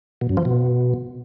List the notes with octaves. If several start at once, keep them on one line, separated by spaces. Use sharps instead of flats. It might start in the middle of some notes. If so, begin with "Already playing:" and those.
B2
F#2
F3
B2